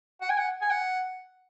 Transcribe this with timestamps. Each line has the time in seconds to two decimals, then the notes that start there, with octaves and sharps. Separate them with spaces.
0.21 F#5
0.30 G#5
0.38 F#5
0.62 G#5
0.70 F#5